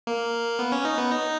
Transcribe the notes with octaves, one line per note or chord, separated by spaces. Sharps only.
A#3
B3
C#4
D#4
B3
D#4